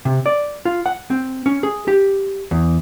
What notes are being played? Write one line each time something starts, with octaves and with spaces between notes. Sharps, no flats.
C3
D5
F4
F#5
C4
C#4
G#4
G4
E2